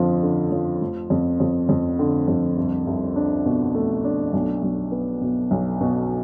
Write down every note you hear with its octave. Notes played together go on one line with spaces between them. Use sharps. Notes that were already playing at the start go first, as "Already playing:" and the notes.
Already playing: F2 D3 F3
D3
F3
F1
F2
F2
F2
D3
F2
C2
C2
D4
B2
A3
D4
B1
B1
B3
B2
B1
B2